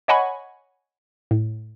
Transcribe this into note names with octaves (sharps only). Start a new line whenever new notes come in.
C#5 D#5 F#5 G#5 B5 C#6
A2